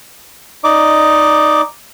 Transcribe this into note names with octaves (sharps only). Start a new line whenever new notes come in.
D#4 D5 D#5 D6